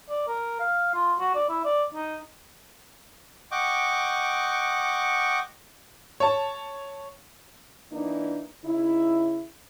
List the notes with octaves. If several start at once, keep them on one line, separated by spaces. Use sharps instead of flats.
D5
A#4
F5
F4
F#4
D5
E4
D5
D#4
D#5 F#5 G5 C#6 D6
C#5 A5
E3 A#3 D4 D#4
C#3 D#4 E4